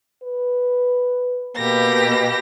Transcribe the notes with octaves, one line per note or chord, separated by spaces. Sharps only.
B4
B2 A#3 G4 A#6